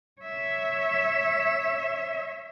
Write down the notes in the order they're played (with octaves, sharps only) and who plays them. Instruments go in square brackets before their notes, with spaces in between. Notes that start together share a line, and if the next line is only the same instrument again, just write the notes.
[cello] C#5 E5